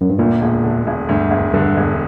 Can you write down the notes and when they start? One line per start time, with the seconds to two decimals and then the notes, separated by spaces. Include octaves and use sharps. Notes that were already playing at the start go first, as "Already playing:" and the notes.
0.01 F#2
0.09 G2
0.19 D2 A#2
0.42 E1
0.64 D3
0.87 E1
1.09 D2 G2
1.31 E1
1.54 G2 D3
1.77 E1